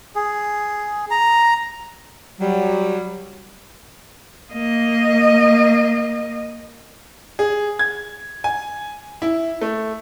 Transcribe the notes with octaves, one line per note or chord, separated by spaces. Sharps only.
G#4
A#5
F#3 G3
A#3 D#5
G#4
G#6
G#5
E4
A3